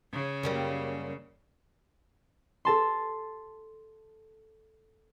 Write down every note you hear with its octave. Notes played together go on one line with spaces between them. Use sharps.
C#3
F#2 G3 A#3
A4 A5 C6